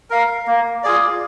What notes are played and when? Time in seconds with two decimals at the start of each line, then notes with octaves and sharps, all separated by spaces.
0.10 A#4 F5
0.47 A#3
0.84 F4 G#4 D5